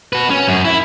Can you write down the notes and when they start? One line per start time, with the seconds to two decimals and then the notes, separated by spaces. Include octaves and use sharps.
0.13 F#4 B4
0.30 C#4
0.48 F#2
0.65 E4